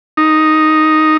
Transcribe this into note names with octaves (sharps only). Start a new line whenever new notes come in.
D#4